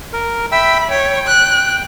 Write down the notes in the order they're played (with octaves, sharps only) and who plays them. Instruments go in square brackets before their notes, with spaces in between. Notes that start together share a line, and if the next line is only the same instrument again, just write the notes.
[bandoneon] A#4
[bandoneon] E5 G5 E6 [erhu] B5
[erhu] C#5 [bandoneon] G5
[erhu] F#6